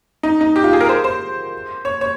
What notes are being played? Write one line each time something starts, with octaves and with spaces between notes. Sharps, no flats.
D#4
D#4
G4
F4
G#4
A#4
C5
C5
C#5
C#5